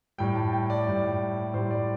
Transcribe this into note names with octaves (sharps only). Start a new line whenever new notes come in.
A2 G3 G5
A5
G5
D5
A2 G3
A2 G3 C5
D5